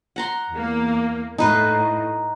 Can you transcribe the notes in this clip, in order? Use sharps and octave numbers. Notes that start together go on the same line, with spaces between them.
F#5 A#5 C6
E2 A#3
A2 D#4 B4 D#5